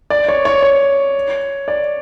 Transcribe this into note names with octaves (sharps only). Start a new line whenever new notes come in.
D5
C#5
C#5
C#5
D5